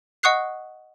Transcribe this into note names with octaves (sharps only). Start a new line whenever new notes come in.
D#5 F#5 C#6 D#6 F#6 C7